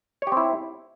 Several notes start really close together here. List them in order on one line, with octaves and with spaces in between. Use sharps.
C#5 G4 C4 E4